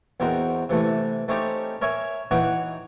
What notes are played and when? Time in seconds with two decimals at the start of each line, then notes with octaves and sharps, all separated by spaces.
0.20 E2 C4 F#4 A#4 D#5
0.69 C3 E3 A3
1.28 A3 C4 C#4 D#4 G4
1.82 A#4 C#5 E5 G#5
2.31 E3 D#4 F#4 C#5 F#5 G5